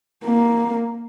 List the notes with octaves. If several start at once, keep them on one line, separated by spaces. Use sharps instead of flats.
A#3